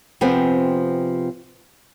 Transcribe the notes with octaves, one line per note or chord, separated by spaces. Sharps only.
C3 F3 B3 C4 G#4